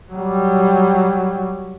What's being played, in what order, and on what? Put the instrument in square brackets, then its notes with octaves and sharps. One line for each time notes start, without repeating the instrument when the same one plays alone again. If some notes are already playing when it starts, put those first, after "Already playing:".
[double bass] F#3 G3